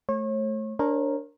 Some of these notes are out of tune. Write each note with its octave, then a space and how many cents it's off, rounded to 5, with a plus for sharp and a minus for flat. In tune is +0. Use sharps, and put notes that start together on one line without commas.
A3 -15 C#5 -35
D4 -15 A#4 +0 C#5 -40